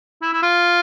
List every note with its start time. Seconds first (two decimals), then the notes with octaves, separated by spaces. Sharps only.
0.22 E4
0.33 E4
0.43 F4